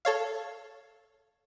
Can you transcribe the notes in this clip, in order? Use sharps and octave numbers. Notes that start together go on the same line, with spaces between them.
A4 C#5 F5